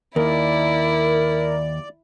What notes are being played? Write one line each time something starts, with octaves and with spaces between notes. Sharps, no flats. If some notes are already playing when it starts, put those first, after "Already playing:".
D#2 E4 A#4 D5